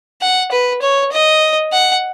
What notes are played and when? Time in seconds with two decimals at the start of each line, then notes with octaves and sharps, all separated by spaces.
0.22 F#5
0.52 B4
0.82 C#5
1.12 D#5
1.72 F#5